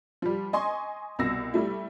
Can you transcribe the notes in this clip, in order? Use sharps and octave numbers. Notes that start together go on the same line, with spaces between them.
F3 G3
D#5 G#5 C6 C#6
C2 B2 E6 A#6
G3 A3 E4